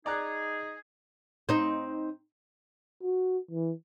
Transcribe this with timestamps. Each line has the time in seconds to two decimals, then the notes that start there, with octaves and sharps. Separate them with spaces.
0.06 D#4 G#4 D5 A#5 F#6
1.49 C4 D#4
3.02 F#4
3.51 E3